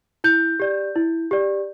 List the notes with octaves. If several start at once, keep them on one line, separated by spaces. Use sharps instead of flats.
E4 G6
G4 D5
E4
G4 D5